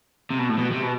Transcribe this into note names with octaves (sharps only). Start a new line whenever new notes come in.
C3
B2
A2
B2
C3
B2